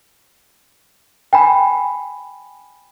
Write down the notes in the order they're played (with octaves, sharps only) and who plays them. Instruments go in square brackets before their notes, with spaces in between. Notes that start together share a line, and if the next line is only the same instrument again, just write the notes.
[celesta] G5 G#5 B5